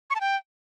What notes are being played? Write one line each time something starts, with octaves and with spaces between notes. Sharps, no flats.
C#6
A5
G5